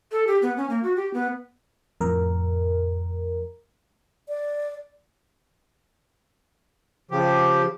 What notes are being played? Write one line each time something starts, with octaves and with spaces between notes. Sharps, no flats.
A4
G4
B3
C#4
A#3
F#4
G4
B3
F2 A2 A#4
D5
C#3 F3 G4